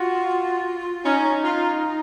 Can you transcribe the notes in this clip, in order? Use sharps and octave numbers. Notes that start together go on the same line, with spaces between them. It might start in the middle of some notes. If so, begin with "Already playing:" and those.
Already playing: F4 F#4
C#4 D#4
F4